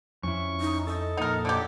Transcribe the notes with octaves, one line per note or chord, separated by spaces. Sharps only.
F2 C#4 E4 C#6
D#4
A4 D#5
F2 A#2 D#4 A#4 F#5
D3 F#3 G4